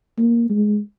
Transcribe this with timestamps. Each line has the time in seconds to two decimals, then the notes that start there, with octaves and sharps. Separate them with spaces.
0.18 A#3
0.50 G#3